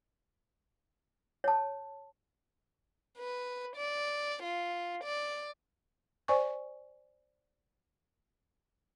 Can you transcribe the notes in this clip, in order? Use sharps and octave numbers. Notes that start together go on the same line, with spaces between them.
C#5 A5
B4
D5
F4
D5
C5 D5 G#5 C#6